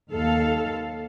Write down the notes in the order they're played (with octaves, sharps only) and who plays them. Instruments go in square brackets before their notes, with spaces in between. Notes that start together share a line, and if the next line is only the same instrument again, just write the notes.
[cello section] D#2 A4 F5